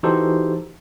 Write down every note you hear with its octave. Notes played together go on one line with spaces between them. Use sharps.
E3 D#4 F#4 G4 A4 C5